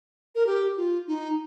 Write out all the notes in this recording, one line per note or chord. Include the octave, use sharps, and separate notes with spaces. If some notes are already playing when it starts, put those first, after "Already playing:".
A#4
G4
F4
D#4